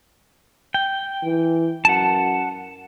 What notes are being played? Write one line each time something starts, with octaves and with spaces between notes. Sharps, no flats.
G5
E3
F#2 F#5 A5